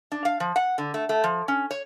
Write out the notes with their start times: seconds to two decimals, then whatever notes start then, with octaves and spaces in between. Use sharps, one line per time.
0.12 D4
0.25 F5
0.40 F3
0.56 F#5
0.78 D3
0.94 A3
1.09 A3
1.24 F3
1.48 C#4
1.71 C#5